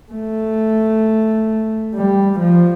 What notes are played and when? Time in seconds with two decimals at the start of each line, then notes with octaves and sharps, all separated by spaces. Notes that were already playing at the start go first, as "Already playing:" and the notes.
0.12 A3
1.95 G3
2.40 F3